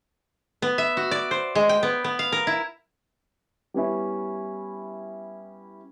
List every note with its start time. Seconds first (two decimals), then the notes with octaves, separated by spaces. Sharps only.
0.62 B3
0.78 E5
0.97 F#4
1.11 D5
1.31 C5
1.55 G#3
1.69 G5
1.83 B3
2.04 B3
2.19 F5
2.32 A#4
2.47 E4
3.74 G3 B3 C#4 E4